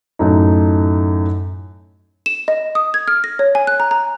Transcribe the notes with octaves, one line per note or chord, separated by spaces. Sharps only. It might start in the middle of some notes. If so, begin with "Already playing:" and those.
F#2 A2 A3 D#4
E7
D#5
D#6
G#6
F6
A#6
C#5
G#5
F#6
A#5
A#5